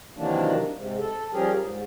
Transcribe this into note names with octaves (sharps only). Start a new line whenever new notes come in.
C3 D#3 E3 F#3 A#3 D4
G#2 C3
A4
F3 G3 C#4 G4 G#4 A#4
G#2